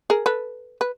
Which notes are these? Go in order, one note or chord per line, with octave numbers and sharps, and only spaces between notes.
G#4 A#4
A4 B4
B4